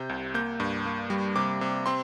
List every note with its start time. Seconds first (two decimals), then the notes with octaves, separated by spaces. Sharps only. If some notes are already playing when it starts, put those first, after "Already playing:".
Already playing: C3 G6
0.09 C2
0.34 A#3 G6
0.60 G2
0.85 A#3
1.10 G3
1.36 C3 D6
1.61 C3
1.86 C4 C6